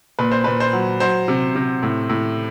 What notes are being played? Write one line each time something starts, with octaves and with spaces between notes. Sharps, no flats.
A#2 B4
C5
A#2 B4
C5
F#3
F#3 C5
C3
C3
A2
A2